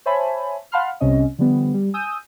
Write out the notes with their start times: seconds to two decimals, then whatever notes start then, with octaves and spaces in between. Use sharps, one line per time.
0.06 C5 C#5 E5 G#5 A5 B5
0.72 F5 F#5 A5 B5 C6 F6
1.00 C2 C3 C#4 D#5
1.39 D3 F3 G3 B3
1.74 G3
1.94 G#5 D#6 E6 G6 D#7